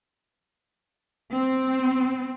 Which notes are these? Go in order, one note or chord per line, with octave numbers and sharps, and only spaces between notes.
C4